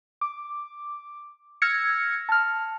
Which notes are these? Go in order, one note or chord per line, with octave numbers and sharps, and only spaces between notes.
D6
E6 F6 G#6 A#6 C#7
A5 F6